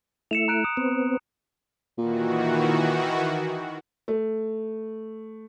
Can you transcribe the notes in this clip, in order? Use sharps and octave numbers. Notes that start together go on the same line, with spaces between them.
A3 E4 C#7 E7 F7
A#5 F#6 D7
D#6
B3 C4
A#2 D#3 E3 F#4
A3